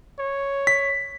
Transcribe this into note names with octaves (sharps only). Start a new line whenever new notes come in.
C#5
B6